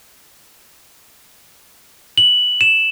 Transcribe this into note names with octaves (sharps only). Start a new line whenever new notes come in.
F#7
E7